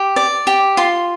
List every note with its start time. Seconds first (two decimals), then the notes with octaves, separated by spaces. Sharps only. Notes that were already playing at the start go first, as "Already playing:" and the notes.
Already playing: G4
0.16 D5
0.47 G4
0.77 F4 C6